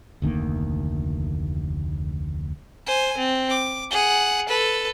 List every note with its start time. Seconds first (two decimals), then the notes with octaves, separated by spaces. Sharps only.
0.22 F1 D2 D#3 A#3
2.86 C5 G#5
3.17 C4
3.50 D6
3.91 G#4 F#5
4.48 A4 B4